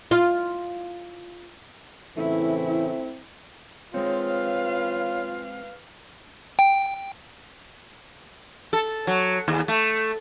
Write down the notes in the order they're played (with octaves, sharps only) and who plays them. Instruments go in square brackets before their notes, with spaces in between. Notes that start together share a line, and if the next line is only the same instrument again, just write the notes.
[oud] F4
[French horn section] A2 C#3 E3 [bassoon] A3 [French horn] C4 [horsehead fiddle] E4
[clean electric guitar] G#3 C4 [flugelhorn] F4 [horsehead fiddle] B4 F5 [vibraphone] C#5
[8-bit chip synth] G5
[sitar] A4
F#3
D#2
A3